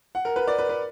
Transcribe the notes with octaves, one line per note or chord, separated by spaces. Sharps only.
F#5
A#4
B4
D5
B4
B4